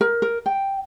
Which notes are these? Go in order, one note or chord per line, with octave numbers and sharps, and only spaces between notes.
A#4
A#4
G5